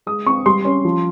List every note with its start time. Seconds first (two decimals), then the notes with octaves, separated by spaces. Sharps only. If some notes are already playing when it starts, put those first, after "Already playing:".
0.06 G#3 D#6
0.26 C4 C#6
0.46 G3 C6
0.65 C#4
0.85 F3